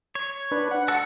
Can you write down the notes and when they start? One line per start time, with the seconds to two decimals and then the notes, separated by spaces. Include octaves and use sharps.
0.15 C#5
0.51 D4 B4
0.71 F#5
0.88 G#3 F#4 A4